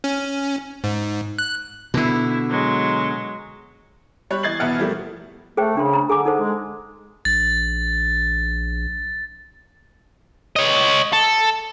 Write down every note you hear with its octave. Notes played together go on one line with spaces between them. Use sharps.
C#4
G#2
F#6
B2 D3 E4
F#3 G#3
G3 C#5 B5 F#6
E3 D#5 G#6 A6 C7 F#7
E2 B2 B3 E5 F#5 F6
F3 G3 A3 A#3
A3 G#4 C5 G5
C#3 D4 C6
A#5
D3 G#4 G#5 D6
D#4 A4 C5
G#3
A#1 A6
C#5 D#5
A4